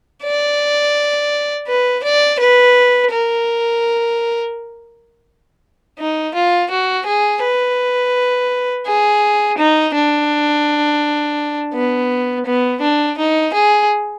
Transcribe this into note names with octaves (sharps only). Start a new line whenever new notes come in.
D5
B4
D5
B4
A#4
D#4
F4
F#4
G#4
B4
G#4
D#4
D4
B3
B3
D4
D#4
G#4